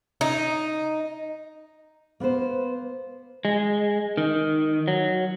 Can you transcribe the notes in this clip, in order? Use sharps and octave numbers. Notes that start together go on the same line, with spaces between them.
D#4
A#3 B3 B4 C5
G#3
D#3
F#3